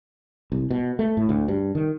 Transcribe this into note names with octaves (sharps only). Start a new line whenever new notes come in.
C2
B2
A3
A2
D2
G2
D#3